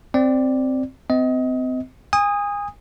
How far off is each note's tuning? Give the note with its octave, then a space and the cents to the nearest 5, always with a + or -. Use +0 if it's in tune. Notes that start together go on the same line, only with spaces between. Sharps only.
C4 +0 D5 +0
C4 -35 D#5 +25
G#5 -30 D#6 +0